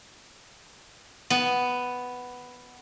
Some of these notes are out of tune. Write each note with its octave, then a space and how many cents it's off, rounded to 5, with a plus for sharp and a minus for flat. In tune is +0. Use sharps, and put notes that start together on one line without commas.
B3 +5